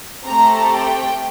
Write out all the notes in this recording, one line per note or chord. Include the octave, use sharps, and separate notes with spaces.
A3 C4 G4 A#5
G5